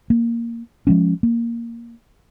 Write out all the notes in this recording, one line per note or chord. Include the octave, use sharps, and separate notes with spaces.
A#3
F3 G#3 C#4
A#3